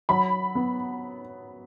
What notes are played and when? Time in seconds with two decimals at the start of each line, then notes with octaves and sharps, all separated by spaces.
0.09 F#3 B5
0.55 B3